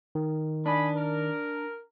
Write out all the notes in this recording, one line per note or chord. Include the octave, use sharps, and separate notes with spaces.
D#3
D4 D#5 G#5 B5
A#4